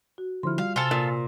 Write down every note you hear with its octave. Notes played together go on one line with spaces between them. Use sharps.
F#4
D3 F3 E4 C6 F6
G3 F4 F5
C3 F4 A4 G#5 E6
A#2